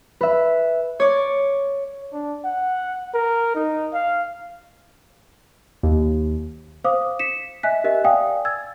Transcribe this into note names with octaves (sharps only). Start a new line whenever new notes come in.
B4 E5
C#5 D5
D4
F#5
A#4
D#4
F5
D#2
C5 F5 D6 D#6
B6 C#7 E7
D#5 E5 G#5 F#6 B6
G4 A#4 D#5 E5
D5 F5 G5 G#5 D#6
E6 G#6 A6